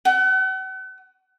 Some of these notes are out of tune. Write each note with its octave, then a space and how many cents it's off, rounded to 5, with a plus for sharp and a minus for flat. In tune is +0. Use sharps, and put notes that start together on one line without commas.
F#5 +40